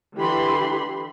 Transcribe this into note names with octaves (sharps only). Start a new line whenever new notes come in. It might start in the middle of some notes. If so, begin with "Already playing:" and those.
D3 E3 G4 B5 C6